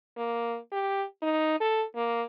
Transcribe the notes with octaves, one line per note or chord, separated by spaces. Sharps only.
A#3
G4
D#4
A4
A#3